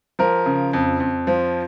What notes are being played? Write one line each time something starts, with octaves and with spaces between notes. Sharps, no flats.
F3 A#4
C#3
F2
F2
F3